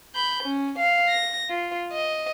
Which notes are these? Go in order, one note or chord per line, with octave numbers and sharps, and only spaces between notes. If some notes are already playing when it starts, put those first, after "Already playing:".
B5 G6
C#4
F5
A#6
F4
D#5